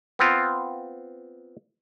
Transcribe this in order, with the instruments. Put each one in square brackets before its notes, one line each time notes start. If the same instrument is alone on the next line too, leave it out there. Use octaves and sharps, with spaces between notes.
[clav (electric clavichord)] B3 C4 F4